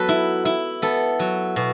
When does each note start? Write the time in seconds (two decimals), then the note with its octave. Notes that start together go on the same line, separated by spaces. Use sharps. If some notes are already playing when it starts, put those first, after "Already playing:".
Already playing: F#3 B3 A4 B4
0.09 E4
0.45 E4
0.82 B3 A4
1.20 F#3
1.56 B2